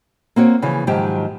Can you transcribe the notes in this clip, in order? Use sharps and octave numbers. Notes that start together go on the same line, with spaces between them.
A#3 C4 F#4 C#5
C#3 E3 F3
G#2 D#3 F3 F#3 G4